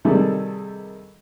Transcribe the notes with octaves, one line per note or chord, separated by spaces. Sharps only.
C3 D#3 G3 D#4 G#4 A4